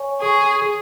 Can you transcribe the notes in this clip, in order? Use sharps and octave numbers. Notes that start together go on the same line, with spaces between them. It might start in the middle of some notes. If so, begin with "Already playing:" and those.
Already playing: C#5 G#5 C#6
G#4 G#5 C#6
G#4